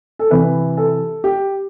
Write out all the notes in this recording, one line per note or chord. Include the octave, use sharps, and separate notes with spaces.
A4
C3 E3 B4
A4
G4